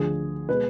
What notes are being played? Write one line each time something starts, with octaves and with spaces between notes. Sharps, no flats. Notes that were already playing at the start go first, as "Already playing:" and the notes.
Already playing: D2 D3 F3 G#4
B2 G#3 B4